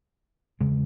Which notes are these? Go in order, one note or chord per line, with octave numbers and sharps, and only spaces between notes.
E2 C#3 G#3